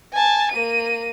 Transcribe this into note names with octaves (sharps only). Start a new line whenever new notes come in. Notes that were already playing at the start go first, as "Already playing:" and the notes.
G#5 A5
A#3 D#7